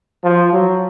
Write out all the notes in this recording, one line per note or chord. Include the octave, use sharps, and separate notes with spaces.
F3
F#3